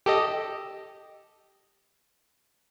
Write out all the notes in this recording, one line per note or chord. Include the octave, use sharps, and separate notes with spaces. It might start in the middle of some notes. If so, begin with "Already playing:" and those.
G4 A4 D#5